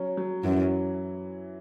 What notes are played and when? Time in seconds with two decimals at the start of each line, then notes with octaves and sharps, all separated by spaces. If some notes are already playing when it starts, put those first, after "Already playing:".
Already playing: F#3 C#4
0.17 F#3
0.44 F#2 E3